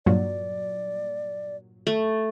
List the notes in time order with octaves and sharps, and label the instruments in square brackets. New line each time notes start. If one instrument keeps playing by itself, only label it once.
[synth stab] G2 A#2 F#3 [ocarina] D5
[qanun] A3